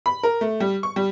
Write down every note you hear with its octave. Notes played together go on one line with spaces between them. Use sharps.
B5
A#4
A3
G3
C#6
G3